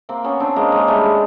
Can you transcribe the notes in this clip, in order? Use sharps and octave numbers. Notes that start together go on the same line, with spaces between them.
A#3 C4
B3 C#4
C4 D4
G#3 A#3
G#3 A#3
G3 A3
G#3